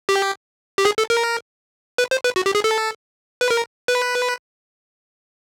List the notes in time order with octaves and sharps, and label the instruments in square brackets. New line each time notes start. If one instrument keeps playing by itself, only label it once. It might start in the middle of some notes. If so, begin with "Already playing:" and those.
[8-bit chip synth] G4
G4
G#4
A4
A#4
B4
C5
B4
F#4
G4
G#4
A4
B4
A#4
B4